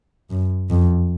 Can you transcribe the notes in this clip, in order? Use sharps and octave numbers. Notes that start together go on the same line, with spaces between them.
F#2
F2